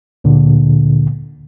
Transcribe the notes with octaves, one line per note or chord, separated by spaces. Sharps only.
D2 A#2 D3